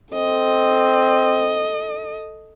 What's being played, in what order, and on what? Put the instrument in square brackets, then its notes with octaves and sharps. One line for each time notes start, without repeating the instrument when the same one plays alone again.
[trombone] C4 [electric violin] A4 D#5